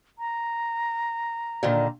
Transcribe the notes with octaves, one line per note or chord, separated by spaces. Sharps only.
A#5
A#2 D3 D#3